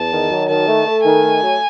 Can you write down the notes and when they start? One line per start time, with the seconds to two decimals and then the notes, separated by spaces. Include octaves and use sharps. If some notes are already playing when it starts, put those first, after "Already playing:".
Already playing: E2 A5
0.12 D#3
0.31 F#3
0.49 D#3 A5
0.68 A3
0.86 A3
1.04 D#3 G#5
1.23 A3
1.41 F#3